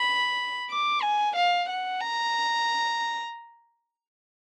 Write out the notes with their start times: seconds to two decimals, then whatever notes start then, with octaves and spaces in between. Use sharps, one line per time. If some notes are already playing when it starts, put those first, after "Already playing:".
Already playing: B5
0.70 D6
1.02 G#5
1.36 F5
1.69 F#5
2.01 A#5